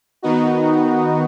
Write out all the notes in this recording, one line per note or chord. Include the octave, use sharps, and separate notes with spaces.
D#3 B3 D#4 F#4